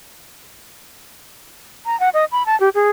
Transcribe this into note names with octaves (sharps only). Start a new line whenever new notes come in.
A#5
F#5
D#5
B5
A5
G4
G#4